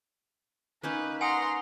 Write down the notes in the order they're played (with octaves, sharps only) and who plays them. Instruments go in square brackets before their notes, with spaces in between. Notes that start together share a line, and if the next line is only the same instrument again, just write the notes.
[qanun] A#3 C#4 D#4 [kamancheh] B4
[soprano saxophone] F#5 [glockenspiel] G#5 D#6 [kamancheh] A#5 C6